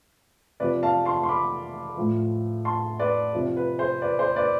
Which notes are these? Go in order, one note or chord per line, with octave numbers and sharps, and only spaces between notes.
C3 F3 B4 D5
F5 A5
A5 C6
C6
B5 D6
A2 F3
A5 C6
B4 D5
C3 F3
B4
C5
B4 D5
C5
B4 D5